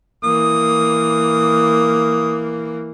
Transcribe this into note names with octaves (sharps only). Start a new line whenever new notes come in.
E3 A#3 D#6